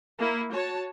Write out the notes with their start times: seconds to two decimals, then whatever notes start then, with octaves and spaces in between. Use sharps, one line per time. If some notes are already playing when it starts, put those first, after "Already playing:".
0.19 A#3 E4
0.51 F#4 C#5 A5